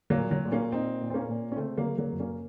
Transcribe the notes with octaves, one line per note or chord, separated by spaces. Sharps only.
F#3 A#3
A#2
F#3
A#2
A#3 C#4
A#2 C4 D#4
A#2
C4
A#3 C#4
A#2
C#4
C#3 A3 C4
F#3 A#3
C#3
F#3 A#3
F#2
A#3 C#4